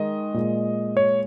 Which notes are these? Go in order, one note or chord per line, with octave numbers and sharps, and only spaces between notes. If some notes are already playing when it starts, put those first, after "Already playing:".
Already playing: D#3 G#3 D#5
A#2 G#3
C#5